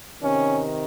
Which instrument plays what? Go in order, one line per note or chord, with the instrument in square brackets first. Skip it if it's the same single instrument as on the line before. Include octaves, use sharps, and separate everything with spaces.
[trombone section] C3 D#3 C#4